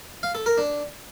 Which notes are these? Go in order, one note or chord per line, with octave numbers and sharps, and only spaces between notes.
F5
A4
A#4
D4